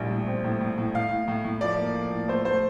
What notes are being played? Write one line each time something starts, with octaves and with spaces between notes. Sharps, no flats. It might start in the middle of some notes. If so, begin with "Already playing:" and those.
Already playing: A#1 A2 G3
A2
C4
A2
A2
A2
A2 F5
A2
A2
A2
F3 D5
A#3
F3
A2
A3 C5
A3 C5